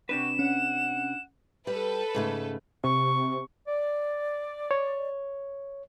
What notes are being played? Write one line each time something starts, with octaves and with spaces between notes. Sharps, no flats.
C3 D4 F#4 G4 B4 E7
C#4 F#5
G3 A4 B4
G#2 C#3 A3
C3 C#6
D5
C#5